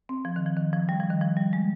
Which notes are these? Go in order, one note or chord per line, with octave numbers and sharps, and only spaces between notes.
C4
F3
D#3
F3
D#3
F3
G3
F3
D#3
F3
G3
G#3